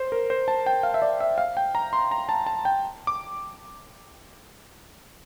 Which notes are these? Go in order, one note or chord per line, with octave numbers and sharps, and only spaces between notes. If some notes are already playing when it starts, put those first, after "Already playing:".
Already playing: C5
A#4
C5
A5
G5
F5
E5
D5
E5
F5
G5
A#5
C6
A#5
A5
A5
G5
D6